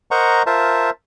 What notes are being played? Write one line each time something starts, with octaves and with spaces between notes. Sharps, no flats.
A#4 C5 D#5 F#5 A#5 C#6
F4 A#4 C5 E5 A5